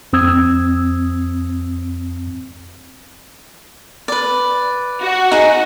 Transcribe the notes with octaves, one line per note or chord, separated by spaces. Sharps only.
F2 C4 D#6 E6 G#6
B4 D5
F#4
D#4 G#4